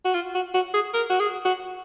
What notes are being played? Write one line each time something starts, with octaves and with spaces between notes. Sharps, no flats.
F#4
F4
F#4
F#4
G#4
A#4
F#4
G#4
F#4